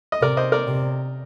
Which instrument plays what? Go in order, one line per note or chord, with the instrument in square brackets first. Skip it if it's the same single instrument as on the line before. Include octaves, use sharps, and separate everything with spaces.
[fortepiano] D#5
[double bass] C3 [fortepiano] A#4 D5
[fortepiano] C5 D#5
A#4 D5
[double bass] C3